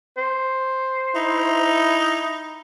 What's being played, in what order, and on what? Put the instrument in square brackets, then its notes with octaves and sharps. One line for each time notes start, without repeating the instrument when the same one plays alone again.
[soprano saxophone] C5
[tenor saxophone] D#4 [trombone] E4